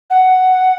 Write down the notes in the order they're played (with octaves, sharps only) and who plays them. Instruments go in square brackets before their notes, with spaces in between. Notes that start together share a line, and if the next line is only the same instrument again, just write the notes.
[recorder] F#5